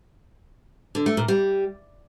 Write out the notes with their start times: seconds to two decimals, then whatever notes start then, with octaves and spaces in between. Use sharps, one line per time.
0.95 D3
1.06 A3
1.17 A#2
1.28 G3